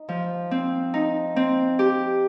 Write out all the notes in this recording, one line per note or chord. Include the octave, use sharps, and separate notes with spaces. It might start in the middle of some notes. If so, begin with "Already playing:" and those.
Already playing: D#4
F3
C4
D#4
C4
G4